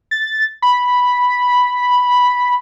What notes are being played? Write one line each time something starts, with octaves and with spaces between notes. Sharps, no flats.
A6
B5